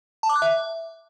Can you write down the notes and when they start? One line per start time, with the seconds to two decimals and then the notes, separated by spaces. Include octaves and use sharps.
0.23 A5
0.29 D6
0.36 F#6
0.42 E5